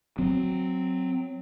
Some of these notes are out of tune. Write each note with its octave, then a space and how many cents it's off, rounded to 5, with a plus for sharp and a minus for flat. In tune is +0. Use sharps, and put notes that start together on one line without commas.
F#3 +0 C4 +0